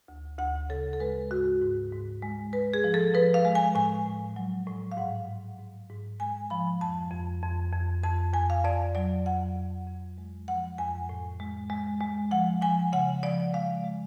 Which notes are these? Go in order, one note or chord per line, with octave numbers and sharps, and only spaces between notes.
D2
D2 F#5
C#3 A4
A4
G#3 B4
G#2 F#4
G#2
G#2
G#3
G#3 B4
G#4
F3
A4
F3 B4
F5
G#3
G#5
A2 G#5
A2
F#3
A2
F5
G#2 F#5
G#2
G#2
G#2
G#3 G#5
F3 B5
F2 A5
F2
F2
F2
F2 A5
F2 G#5
F5
F2 D5
F#3 D5
F2 F#5
F2
F2
G#3
F3 F#5
F2 G#5
A2
G#3
G#3
G#3
F3 F#5
F3 G#5
C#3 F#5
F3 D5
G#3 F5
G#3